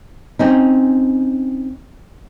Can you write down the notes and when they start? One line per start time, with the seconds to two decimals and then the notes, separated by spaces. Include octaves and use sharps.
0.39 C4 C#4 D#4